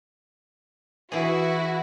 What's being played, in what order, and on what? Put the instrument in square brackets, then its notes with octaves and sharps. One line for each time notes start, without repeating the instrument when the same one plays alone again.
[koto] E3 G#4 [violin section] E4 F#4